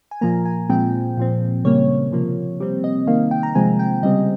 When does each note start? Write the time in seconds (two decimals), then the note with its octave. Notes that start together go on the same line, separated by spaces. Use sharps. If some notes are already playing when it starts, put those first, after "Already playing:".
0.11 G#5
0.21 A#2 F3 A#3 A#5
0.45 G#5
0.69 A#2 F3 G#3 C4 G5
1.17 A#2 F3 C4
1.64 C#3 G3 A#3 C#5
2.12 C3 F3 A#3
2.60 C3 G3 C4
2.84 D#5
3.07 D#3 A#3 F5
3.31 G5
3.43 A#5
3.55 C3 F3 G#3 C4 G#5
3.79 G5
4.02 C#3 G3 C4 D#5